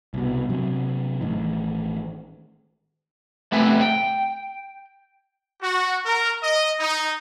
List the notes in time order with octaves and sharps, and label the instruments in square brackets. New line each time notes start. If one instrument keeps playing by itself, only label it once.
[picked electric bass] C2 B2
C3 F#3 C4
A1 D#3
[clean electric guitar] A3 B3 C4 B4 E5 G#5
G5
[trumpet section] F#4
A#4
D#5
D#4